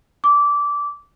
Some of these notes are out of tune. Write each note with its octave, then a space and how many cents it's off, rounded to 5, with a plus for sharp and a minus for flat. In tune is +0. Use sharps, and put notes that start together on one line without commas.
D6 -15